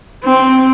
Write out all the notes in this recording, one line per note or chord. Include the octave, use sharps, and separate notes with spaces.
C4